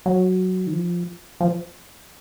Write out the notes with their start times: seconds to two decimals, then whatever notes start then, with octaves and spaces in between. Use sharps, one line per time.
0.06 F#3
0.67 D#3
0.73 F3
1.40 F3